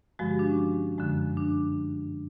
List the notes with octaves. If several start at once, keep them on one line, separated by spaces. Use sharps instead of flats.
G2 D3 F3 G#3 F#4
G4
D4
C#4
F#2 D3 F3 G#3
D4